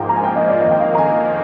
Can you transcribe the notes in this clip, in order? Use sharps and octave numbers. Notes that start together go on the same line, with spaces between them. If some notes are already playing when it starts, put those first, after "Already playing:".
Already playing: G#2 F3 A#3 G5
A#5
G#5
G5
D#5
D5
F2 D#3 A#3 D#5
G5
F5
A#5
G#5